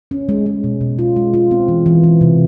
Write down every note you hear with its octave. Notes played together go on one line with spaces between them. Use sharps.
C#4
G#3
G#3
B2
B2
F4
G#3
F4
C4
E3
E3
E3
C3